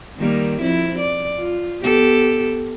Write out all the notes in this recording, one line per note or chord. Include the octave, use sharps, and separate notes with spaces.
D#3 G3 A#3
F2 C4 E4
D5
F4
B3 G4 A4